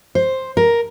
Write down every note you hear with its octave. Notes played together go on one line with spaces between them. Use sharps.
C5
A#4